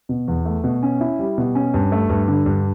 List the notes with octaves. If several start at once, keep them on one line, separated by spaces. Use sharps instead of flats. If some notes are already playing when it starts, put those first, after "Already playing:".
B2
E2
A3
B2
C#4
E4
G3
B2
C#4
G2
A3
G2
D3
G2